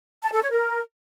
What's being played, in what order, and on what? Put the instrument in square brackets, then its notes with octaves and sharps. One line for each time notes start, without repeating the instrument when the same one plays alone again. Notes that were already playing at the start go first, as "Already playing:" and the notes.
[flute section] A5
A4
C#5
A#4